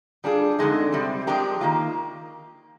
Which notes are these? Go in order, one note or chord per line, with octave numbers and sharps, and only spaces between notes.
G3 D4 F4 G#4
F2 D3 G#3 D#4
C3 G3 C4
F3 G#3 D4 G4 A#4
D#3 A#3 F4